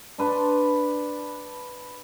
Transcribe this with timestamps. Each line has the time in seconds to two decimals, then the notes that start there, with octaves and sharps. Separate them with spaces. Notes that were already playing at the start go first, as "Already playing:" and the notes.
0.18 D4 B4 A5 C6